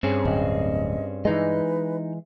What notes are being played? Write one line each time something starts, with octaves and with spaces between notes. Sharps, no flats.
G2 C4 C#4 G#4
D1 D#5
E3 G#3 D#4 B4 D#5